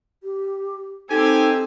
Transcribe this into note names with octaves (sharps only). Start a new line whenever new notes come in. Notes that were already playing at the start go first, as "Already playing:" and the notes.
G4
C4 D#4 G4 A4 G#5